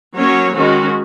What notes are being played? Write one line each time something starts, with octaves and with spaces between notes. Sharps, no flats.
F#3 A#3 C#4 C#5
D#3 G#3 C#4 F#4